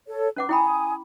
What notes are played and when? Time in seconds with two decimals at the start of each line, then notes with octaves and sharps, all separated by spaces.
0.07 A4 C#5
0.36 C#4 B4 F#5 D6
0.49 E4 G5 G#5 B5 D#6